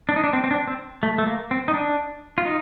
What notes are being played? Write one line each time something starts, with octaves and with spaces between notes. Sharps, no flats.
D4
D#4
D4
C4
C4
D4
C4
A3
A3
A#3
C4
D#4
D4
F4
D#4